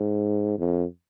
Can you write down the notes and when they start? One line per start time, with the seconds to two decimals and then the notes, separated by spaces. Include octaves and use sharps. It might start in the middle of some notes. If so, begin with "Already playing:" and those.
Already playing: G#2
0.58 F2